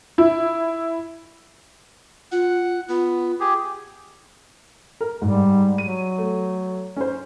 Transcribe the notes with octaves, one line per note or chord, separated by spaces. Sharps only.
E4
F4 F#5
B3 F4
G4 G#4
A#4
G#2 G3
F#3 D#7
A3
C#4 C5